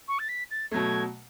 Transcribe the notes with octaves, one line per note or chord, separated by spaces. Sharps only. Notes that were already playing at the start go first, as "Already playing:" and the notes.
C#6
A6
B6
A6
B2 F#3 A3 G#6